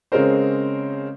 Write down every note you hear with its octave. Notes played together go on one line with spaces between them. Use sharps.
C#3 G#3 C4 C#4 A#4 C5